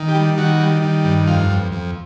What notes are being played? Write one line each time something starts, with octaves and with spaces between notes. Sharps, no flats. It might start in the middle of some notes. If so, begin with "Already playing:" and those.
Already playing: D#3
G4
G3
D#3 F#4
G3
D#3
G2
F2 F4
F2
F2